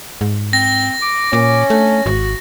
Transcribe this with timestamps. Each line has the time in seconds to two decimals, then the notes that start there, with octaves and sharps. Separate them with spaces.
0.21 G#2
0.53 C4 A#6
1.02 D6
1.33 A#2 C#4 D6
1.70 A3 D4
2.06 G#1 F#4